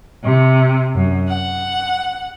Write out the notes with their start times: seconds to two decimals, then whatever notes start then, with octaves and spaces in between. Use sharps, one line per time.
0.22 C3
0.94 F#2
1.28 F#5